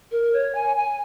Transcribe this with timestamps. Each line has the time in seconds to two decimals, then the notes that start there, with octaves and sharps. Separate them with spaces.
0.11 A#4
0.33 C#5
0.55 G#5
0.76 G#5